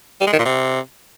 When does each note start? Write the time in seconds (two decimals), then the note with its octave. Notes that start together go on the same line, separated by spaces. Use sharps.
0.21 G3
0.27 G#3
0.33 D#3
0.39 A#2
0.45 C3